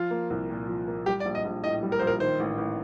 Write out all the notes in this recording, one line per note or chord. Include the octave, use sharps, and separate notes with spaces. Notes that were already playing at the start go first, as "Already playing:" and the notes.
Already playing: F3 F4
A#3
C2
A#2
F3
A#3
G3 G4
D5
A#1
D#5
A#1
A2 D#5
G3
A#4
A#1 C5
A#4
D#3 C5
A1
A1